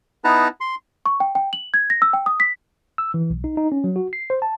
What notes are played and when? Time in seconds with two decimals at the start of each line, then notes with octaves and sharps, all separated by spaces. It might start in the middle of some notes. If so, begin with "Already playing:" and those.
0.24 B3 D#4 E4 B4 A5 A#5
0.60 C6
1.06 C#6
1.20 G5
1.35 G5
1.53 F#7
1.74 G#6
1.90 A#6
2.02 E6
2.13 G5
2.26 D#6
2.40 B6
2.98 E6
3.14 E3
3.30 B1
3.44 D#4
3.57 D#4
3.72 C#4
3.84 F#3
3.96 F#4
4.13 C7
4.30 C5
4.42 A5